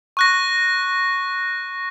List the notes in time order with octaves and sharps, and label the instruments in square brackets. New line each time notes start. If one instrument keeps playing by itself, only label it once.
[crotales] C#6 F#6 A#6